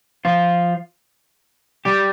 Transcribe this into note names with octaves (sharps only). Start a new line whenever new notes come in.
F3 F4
G3 G4